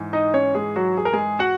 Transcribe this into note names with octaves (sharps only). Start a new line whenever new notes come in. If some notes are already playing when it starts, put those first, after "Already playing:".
Already playing: G#2 E3
D#4 D#5
C#4 C#5
G#3 G#4
F#3 F#4
G#4
A#4
G#3 G#4
F#4 F#5